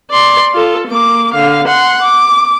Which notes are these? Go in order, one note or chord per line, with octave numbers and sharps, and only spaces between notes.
D5 C6
F4 A4
A#3 D6
D3 F5
F#5 C6
D6